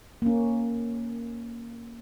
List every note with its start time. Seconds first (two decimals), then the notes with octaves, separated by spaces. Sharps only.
0.22 A#3 C#4